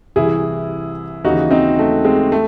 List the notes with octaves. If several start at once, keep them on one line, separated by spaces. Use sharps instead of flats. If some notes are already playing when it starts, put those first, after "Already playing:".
C2 C3 E3 E4 G#4
D#2 C#3 E3 D#4 F#4
C4 D#4
A3
G#3 C4
A3